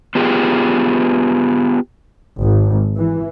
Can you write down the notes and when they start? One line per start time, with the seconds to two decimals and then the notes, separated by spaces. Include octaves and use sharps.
0.15 B3 F4 G4 G#4
2.40 G#1
2.96 E3